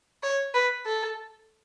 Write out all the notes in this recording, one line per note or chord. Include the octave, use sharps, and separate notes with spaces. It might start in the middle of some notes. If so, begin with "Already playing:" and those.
C#5
B4
A4